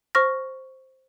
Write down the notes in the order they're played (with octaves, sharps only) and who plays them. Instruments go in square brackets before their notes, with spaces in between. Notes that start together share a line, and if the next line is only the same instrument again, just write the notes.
[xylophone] C5 C#6 F6 A#6